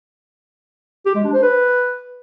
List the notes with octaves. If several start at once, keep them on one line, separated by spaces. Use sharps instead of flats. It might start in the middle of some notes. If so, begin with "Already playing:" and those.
G4
G#3
D4
C5
B4